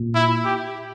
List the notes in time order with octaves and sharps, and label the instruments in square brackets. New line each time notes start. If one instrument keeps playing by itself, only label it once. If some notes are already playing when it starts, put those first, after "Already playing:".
Already playing: [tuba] A#2
[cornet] E4
G4